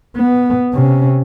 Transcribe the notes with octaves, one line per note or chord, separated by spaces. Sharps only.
B3
C3 C#4